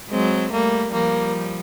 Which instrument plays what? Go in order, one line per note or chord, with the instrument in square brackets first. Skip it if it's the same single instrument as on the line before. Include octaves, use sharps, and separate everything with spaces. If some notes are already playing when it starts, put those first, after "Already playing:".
[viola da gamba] F#3 G#3 [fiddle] C4
[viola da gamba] G3 A3 [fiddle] A#3
[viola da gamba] F3 G3 [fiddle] A#3